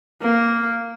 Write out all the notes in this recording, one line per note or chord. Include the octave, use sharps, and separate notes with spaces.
A#3